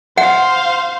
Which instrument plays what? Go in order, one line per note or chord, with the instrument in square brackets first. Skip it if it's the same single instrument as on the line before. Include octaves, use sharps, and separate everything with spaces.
[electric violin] C5 F5 [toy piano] F#5